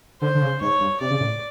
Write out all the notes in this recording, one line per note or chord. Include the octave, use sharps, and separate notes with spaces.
D3 C5
D3
C#3
G#2 C#5
G2
C3 D5
C#3
A2